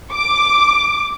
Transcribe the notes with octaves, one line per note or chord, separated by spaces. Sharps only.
D6